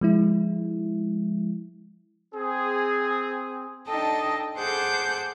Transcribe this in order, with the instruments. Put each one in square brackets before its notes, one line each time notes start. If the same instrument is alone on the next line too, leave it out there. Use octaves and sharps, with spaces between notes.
[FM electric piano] F3 G#3 E4
[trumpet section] C4 G#4
[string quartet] D4 D#4 A4 D#5 G5 A5
G#4 A4 C5 F#5 D6 G6